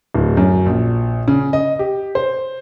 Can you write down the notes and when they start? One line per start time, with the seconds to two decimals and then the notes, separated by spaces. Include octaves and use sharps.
0.14 D1
0.37 F#2
0.66 A#1
1.28 C#3
1.53 D#5
1.79 G4
2.15 C5